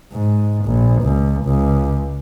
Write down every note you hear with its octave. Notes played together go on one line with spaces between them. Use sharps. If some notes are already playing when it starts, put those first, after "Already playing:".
G#2
A#1
C#2
C#2